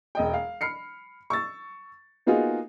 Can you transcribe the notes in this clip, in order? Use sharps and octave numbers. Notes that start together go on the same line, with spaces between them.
E1 D#5 G5
F5
B5 F6 C7 C#7
C#6 E6 A6
A#3 B3 D#4 F4 F#4 G#4